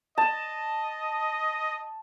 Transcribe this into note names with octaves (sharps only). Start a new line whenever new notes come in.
D#5 A5